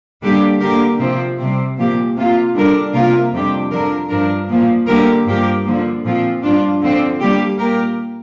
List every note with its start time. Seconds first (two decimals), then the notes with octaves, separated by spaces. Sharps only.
0.22 D3 G3 A#3 D4 G4
0.60 D3 A#3 G4 A#4
0.99 C3 F3 C4
1.38 C3 G3 C4
1.78 A#2 F3 A#3 G4
2.16 C3 A#3 F4
2.55 D3 G3 D4 A#4
2.93 C3 A#3 F4 A#4
3.32 F2 C3 G3 D4 G4
3.71 D3 F3 D4 A#4
4.09 G2 F3 D4 A#4
4.48 A#2 F3 A#3
4.87 D3 G3 A#3 G4 A#4
5.26 G2 F3 A#3 G4 A#4
5.65 D3 F3 A#3
6.04 A#2 F3 C4 F4
6.43 G2 F3 D4 F4
6.81 D3 F3 C4
7.20 D3 G3 A#3 G4
7.58 A#2 A#3 G4 A#4